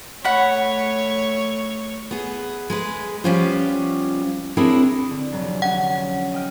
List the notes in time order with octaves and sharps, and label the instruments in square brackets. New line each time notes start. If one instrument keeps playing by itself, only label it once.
[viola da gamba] A3 C#5 [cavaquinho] F#5 B5
[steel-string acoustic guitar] B3 G#4
G#3 G#4 B4
F3 G3 B3 C#4 F4 C5
C4 D4 E4 G#4 A#4 C#5
[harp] D3
F1 F#3
[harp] C#4 [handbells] F#5
[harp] D#5 G5 F6